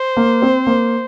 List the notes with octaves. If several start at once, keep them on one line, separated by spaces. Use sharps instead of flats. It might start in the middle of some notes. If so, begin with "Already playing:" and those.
Already playing: C5
A#3
C4
A#3